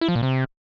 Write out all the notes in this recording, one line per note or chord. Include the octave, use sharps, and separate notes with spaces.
E4
F3
A#2
C3